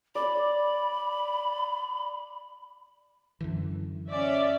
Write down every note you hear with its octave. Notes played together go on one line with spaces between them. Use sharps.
D5 B5
F#2 D3 E3
C#4 D5 E5